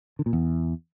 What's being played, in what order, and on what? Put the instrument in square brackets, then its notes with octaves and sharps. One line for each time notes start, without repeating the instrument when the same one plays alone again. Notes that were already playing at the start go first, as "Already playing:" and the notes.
[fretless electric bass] D3
A#2
E2